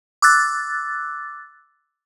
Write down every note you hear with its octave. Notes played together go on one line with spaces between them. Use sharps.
D6 E6 F#6 A6